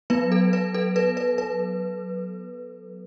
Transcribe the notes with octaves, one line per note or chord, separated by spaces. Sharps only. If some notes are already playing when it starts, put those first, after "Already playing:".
F#3 B3 B4
A4
B4
A4
B4
B4
B4